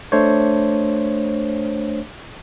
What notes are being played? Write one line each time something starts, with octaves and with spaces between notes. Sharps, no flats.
A3 D4 C5 C#5